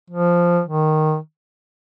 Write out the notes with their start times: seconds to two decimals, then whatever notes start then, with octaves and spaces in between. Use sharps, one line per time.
0.10 F3
0.66 D#3